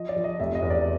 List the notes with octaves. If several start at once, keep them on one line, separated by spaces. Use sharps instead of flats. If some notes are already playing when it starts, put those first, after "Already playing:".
Already playing: F3 D#5
D5
F3
D#5
F1 E5
D#5
E2
D5